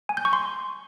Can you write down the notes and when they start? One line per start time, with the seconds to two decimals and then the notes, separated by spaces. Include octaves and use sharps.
0.09 G#5
0.17 G6
0.25 C#6
0.33 C6